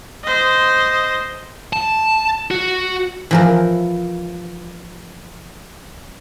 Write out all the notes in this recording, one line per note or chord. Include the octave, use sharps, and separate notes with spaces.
C5 D#5
A5
F#4
E3 F3 A#4